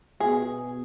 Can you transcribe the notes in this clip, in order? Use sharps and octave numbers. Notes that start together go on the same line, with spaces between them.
B2 G#4